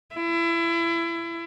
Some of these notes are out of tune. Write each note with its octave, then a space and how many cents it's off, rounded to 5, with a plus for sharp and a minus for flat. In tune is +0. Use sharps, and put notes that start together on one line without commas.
E4 +30